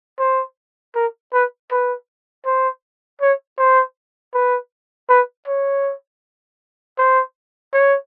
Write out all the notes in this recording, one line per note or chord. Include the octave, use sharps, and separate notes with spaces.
C5
A#4
B4
B4
C5
C#5
C5
B4
B4
C#5
C5
C#5